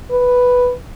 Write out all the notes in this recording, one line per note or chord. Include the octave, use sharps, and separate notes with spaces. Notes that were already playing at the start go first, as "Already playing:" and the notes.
B4